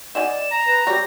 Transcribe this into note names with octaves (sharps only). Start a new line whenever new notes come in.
D#4 D5 F#5 G#5 E7
A#5
B4 A#6
F#3 G3 G4 C#5 A#6